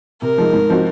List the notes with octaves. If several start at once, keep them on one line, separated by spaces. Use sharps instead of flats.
C3 A#4
F3 G#3 D#4
G#2
F3 C4 D#4 F#4